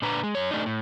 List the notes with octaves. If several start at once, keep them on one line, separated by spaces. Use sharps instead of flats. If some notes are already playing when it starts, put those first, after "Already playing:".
A#2 D4 B4 A#5
G#3
F#2 C#5
A3 D4 D#4
A2